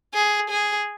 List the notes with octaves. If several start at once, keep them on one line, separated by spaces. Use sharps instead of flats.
G#4
G#4